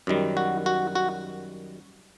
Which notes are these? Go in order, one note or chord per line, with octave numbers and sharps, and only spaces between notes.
F#2 D#3 G3
F#4
F#4
F#4